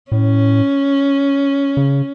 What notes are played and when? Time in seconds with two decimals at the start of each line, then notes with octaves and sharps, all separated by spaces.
0.11 A2 C#4
1.77 C#3